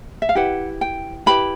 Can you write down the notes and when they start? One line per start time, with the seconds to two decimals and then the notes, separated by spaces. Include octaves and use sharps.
0.22 E5
0.29 F5
0.35 E4 G4 B4 F#5
0.81 G5
1.26 E4 G4 B4 B5